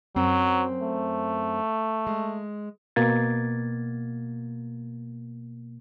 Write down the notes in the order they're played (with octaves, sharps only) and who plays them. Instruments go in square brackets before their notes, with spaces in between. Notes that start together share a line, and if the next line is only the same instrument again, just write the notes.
[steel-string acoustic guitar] F#2 C4 C5 [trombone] F#3
[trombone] A3
[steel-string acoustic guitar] G#3
[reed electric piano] B2 A#3 G#6 A6